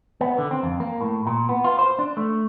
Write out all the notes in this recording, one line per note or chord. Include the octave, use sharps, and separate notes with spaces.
B3
D3
C4
F2
A#3
A2
A#2
B3
F4
C5
D4
A3